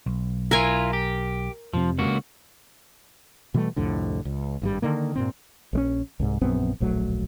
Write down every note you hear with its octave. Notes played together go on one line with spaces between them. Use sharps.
B1
E4 F4 A#4 G#5
G4
F1 C3 F3
C#2 A#3 F#4
B2 E3 G3 A3
C2 F2 A2 D3
C#2
G#1 G2 G3
D3 D#3 A#3
G2 A#2 C4
A#1 G#3 C#4
C2 G#2
A#1 F#2 B3 C4
D1 A#1 F#3 A3